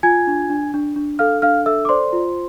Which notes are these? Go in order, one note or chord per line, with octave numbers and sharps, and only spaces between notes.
F4 G#5 G#6
D4
D4
D4
D4
A4 F5 F6
D4 F5 F6
A4 E5 E6
D6
C5 D5 C6
F4